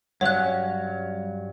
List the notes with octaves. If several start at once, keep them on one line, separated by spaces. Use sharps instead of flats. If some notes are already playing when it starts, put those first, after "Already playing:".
G2 F#3 C#4 C#5 F#5 F#6